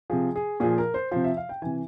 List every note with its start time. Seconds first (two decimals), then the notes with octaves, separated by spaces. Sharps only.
0.10 C3 F3 G#4
0.36 G#4
0.60 A#2 F3 G#4
0.78 A#4
0.94 C5
1.11 C3 F3 C5
1.24 E5
1.37 F5
1.49 G5
1.62 C3 E3 G#5